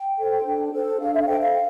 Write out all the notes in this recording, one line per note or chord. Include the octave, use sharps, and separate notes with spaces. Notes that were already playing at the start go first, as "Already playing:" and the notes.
Already playing: G5
A4 C5
D4
A4 C5
D4 F5
E5
F5
A4 C5 G5
F5